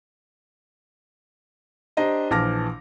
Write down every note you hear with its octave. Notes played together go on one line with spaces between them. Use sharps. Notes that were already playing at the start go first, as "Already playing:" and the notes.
D4 G4 C5 D#5 A#5
A#1 E3 A5 D6 F6 A#6